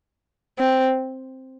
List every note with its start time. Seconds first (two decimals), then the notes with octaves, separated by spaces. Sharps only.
0.59 C4